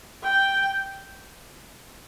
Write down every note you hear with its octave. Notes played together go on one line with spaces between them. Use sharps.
G5